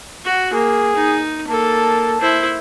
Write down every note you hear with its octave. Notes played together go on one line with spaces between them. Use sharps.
F#4
A#3 G#4
D#4
A#3 A4 A5
E4 C5